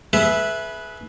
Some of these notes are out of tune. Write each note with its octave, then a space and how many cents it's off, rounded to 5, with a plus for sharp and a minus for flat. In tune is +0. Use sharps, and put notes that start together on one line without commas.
G#4 +35 B4 -10 E5 +0